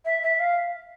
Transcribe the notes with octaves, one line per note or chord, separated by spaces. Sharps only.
E5
E5
F5